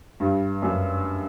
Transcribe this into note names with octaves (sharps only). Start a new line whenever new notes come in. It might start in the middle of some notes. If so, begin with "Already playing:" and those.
G2
F#2